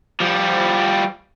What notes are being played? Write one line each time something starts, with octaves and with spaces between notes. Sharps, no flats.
F3 G3